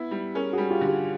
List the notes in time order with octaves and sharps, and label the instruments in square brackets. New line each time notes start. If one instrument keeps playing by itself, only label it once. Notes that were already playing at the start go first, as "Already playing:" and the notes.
Already playing: [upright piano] B3 E4
G3
[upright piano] C#4 [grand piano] G#4 A#4
[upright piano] G3 [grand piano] F#4 G#4
[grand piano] F4 G4
[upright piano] D3
[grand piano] F#4 G#4